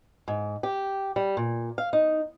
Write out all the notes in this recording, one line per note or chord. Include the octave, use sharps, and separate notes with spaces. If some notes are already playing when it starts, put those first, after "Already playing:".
G#2
G4
G3
A#2
F5
D#4